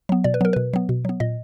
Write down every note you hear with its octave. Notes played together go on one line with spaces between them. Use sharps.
F#3 B3
B2 D5
B4
F#3 B3 A#4
B2 B4
F#3 B3
B2
F#3 B3
A#2 D#5